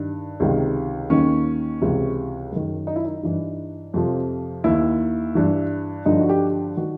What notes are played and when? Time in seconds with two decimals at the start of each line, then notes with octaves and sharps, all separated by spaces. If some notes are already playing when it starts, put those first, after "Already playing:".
Already playing: G2 D#3
0.40 C#2 C3 D#3
1.10 D#2 D#3 C#4
1.82 C#2 C3 E3
2.52 F#2 D#3
2.87 D#4
2.96 E4
3.05 D#4
3.23 G2 E3
3.94 F2 C3 F3
4.64 D#2 D#3 E4
5.35 G2 E3
6.06 G2 D3 F3 D#4
6.20 F#4
6.29 G4
6.77 D#3 F#4